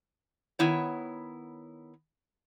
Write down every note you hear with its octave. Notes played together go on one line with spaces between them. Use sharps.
D#3 B3 E4 C#5